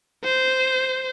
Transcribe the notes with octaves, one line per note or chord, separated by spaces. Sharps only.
C5